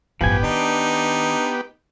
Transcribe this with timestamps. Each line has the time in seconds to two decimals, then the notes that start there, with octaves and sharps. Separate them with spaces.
0.21 A1 G2 F3 B3 G4 G#5
0.43 D#3 D4 D#4